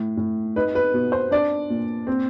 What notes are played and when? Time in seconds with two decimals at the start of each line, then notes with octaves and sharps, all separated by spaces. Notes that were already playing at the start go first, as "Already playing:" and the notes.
Already playing: A2
0.17 A2
0.56 D#4 B4
0.75 B4
0.94 B2
1.12 C5
1.31 D4 D5
1.70 A#2
2.07 C4